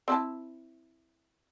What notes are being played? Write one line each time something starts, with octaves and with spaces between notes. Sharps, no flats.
C4 E4 A5